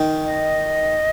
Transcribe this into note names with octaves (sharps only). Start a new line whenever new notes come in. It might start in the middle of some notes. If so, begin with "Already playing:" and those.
Already playing: D#3
D#5